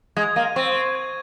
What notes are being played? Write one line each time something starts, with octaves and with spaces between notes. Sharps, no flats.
G#3 G#6
A#3 D#7
C4 C#6
C#6
G#6